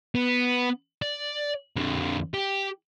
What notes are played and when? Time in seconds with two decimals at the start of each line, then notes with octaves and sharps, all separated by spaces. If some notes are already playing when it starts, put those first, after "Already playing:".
0.15 B3
1.02 D5
1.76 F2 D3
2.34 G4